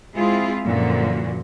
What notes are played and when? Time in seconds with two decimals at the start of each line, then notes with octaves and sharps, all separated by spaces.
0.15 G#3 C4 E4 F4 G#4
0.65 F#2 A#2 D3 E3 F3 F#4